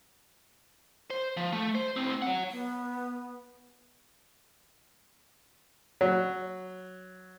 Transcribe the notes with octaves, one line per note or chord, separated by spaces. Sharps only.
C5
F3
A3
C5
A2 C4
C#5 F#5
B3
F#3